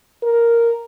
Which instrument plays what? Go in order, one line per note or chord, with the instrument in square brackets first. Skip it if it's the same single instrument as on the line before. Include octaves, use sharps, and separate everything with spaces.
[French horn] A#4